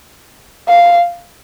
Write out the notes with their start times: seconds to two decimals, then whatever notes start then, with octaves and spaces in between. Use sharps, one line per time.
0.68 F5